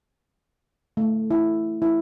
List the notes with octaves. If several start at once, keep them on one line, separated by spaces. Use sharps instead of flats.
A3
E4
E4